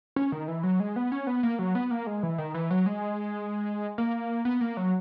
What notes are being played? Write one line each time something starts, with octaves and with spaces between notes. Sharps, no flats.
C#4
D#3
E3
F#3
G#3
B3
C#4
B3
A#3
F#3
B3
A#3
G#3
E3
D#3
E3
F#3
G#3
A#3
B3
A#3
F#3